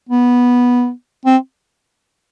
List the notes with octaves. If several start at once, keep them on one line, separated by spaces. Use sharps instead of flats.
B3
C4